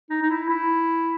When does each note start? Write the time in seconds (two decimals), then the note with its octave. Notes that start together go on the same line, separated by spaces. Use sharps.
0.10 D#4
0.22 D#4
0.30 E4
0.50 E4